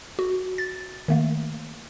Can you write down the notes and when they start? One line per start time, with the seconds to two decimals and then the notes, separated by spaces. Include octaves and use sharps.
0.19 F#4
0.58 A6
1.08 D#3 A3 A#3